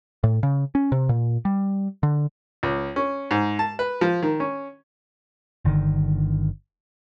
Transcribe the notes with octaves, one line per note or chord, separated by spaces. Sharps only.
A2
C#3
C#4
C3
A#2
G3
D3
C#2
C#4
G#2
A5
B4
F3
D#3
C#4
G1 D3 D#3